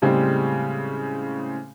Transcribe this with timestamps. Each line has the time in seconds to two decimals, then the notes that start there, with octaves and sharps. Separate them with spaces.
0.02 A2 C#3 G3 G#3 C4